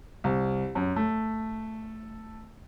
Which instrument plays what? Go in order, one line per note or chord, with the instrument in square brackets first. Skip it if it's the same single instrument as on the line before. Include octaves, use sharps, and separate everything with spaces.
[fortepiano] C2
F#2
A3